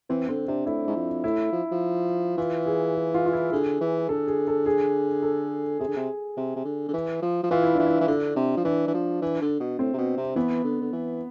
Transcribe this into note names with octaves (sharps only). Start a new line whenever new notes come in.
E3 C4
D3 C4
C3 D4
A2 E4
G#2
F2
A2 E4
F3
F3
E3 F4
G#4
G#4
F4
F4
E4
D3 G#4
E3
D3 A4
G#4
A4
G#4
A4
C3 G#4
D3
C3
C3
C3
D3
D3
E3
F3
F3
E3 F4
E4
E3 D4
E4
E3
D3 D4
C3
F3
E3 D4
E3
F3
E3
D3
B2
A2 C4
C3
B2
C3
E3 B3
D3
D3
E3